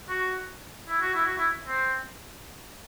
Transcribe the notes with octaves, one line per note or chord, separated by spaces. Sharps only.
F#4
E4
F#4
E4
F#4
E4
C4